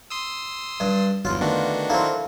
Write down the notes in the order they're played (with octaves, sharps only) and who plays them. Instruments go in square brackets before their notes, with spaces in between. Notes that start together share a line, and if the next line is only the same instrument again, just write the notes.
[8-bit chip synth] C6 D#6 E6
[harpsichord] G2
[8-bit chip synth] G1 E2 [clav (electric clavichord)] F#3 [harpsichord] F4
[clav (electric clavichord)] D3 A3 B3 [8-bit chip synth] D#3 D4 F#4
[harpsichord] A#3 C4 [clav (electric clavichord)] E4 A4 A#4